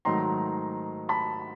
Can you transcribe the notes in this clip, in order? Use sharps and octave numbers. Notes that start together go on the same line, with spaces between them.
G#2 D#3 F#3 A3 A#5 C6
A5 B5